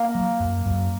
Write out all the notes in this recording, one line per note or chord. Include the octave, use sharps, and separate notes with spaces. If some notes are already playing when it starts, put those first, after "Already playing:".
Already playing: A#3
F#3
F#2
F#2